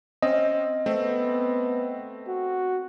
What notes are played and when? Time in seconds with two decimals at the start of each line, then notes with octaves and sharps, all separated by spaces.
0.23 C4 C#4 D#5
0.86 A3 B3 C4
2.28 F#4